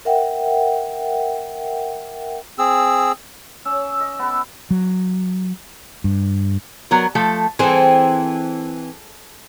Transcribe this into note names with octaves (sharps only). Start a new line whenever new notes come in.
A#4 E5 F#5 G5
C4 G#4 E6
C#4 E6
D#5
B3 B4
F#3
G2
F#3 B3 A#4
F3 A3 A4
E3 C4 G#4 A4